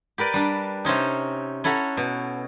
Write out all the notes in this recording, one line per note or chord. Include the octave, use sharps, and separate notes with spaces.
G4 A#4 B4 D5
G3 D4
C3 C4 C#4 D#4
C#4 E4 A4 F#5 A#5
B2